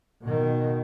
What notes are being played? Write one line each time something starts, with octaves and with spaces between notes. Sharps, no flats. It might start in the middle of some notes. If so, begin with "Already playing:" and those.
B2 D#3